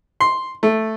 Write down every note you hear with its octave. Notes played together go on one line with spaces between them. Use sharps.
C6
A3